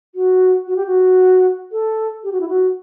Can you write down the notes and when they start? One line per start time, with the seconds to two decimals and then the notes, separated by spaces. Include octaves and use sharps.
0.15 F#4
0.67 F#4
0.76 G4
0.87 F#4
1.72 A4
2.24 G4
2.32 F#4
2.41 E4
2.49 F#4